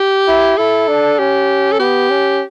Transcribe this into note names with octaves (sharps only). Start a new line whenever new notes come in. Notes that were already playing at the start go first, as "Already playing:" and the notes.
Already playing: G4
E4
E4 A4
D4
C#4 G4
A4
B3 G4
C#4